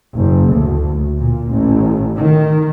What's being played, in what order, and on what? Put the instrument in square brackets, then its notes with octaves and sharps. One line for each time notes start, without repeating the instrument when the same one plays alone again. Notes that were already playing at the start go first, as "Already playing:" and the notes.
[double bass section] F#1
D2
A#2
A1
D#3